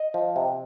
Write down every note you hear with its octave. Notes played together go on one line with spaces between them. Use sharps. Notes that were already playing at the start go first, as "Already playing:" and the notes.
Already playing: D#5
F3
C3